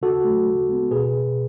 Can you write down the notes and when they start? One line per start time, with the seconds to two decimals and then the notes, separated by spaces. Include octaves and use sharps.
0.02 C#3 F#4 A4
0.25 F#3 A3
0.47 C#3
0.69 G#3 B3
0.91 B2 G#4 B4